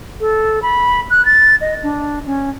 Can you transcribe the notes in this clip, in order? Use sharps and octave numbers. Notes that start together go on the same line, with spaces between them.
A4
B5
F#6
A6
D#5
D4
C#4